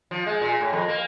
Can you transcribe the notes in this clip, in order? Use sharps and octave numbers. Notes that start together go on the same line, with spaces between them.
F3
G#3
A#2
A2
F2
A#3